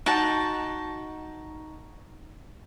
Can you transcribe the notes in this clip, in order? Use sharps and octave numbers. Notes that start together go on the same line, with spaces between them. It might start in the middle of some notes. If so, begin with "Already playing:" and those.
D#4 F#4 A5